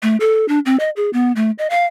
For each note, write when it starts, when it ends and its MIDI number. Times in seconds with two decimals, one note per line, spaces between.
0.03 0.17 57
0.20 0.46 69
0.49 0.59 62
0.66 0.76 60
0.80 0.90 75
0.96 1.10 68
1.13 1.32 59
1.36 1.51 57
1.59 1.67 75
1.70 1.85 77